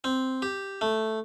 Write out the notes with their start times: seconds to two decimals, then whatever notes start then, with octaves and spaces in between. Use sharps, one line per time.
0.04 C4
0.42 G4
0.81 A3